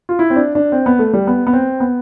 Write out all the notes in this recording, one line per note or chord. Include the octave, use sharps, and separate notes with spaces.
F4
E4
C4
D4
D4
C4
B3
A3
G3
B3
B3
C4
B3